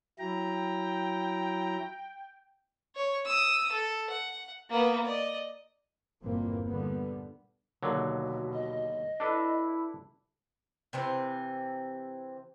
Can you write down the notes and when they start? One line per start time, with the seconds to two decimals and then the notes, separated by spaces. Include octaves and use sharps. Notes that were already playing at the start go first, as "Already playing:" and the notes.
0.19 F#3 E4 G5 A#5
2.96 C#5
3.26 D#6 E6
3.71 A4
4.09 F#5
4.70 A#3 B3
5.05 D5 D#5
6.23 G1 E2 A#2 E3 A#3 C4
6.67 A#2 D3 G3 B3
7.83 D#2 B2 D3 F#3
8.53 D#5
9.20 D4 E4 A4 B4
10.93 C3 E3 C4